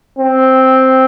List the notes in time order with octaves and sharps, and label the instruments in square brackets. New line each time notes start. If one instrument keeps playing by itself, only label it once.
[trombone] C4